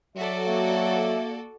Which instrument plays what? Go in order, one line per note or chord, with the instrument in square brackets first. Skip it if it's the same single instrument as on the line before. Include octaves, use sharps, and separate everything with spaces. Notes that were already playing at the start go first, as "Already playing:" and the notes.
[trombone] F#3 [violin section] F#4 A4 D5 [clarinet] E5
[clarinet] A#3 [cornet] E5